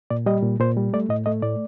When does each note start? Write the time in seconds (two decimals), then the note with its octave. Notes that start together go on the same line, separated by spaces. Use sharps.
0.10 A#2 D5
0.26 G3 D#5
0.43 A#2
0.60 A#2 C5
0.77 G3
0.93 A3 D5
1.09 A2 D#5
1.26 A3 D#5
1.42 A2 D5